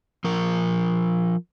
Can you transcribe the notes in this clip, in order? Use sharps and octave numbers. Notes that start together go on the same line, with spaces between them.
F3 A#4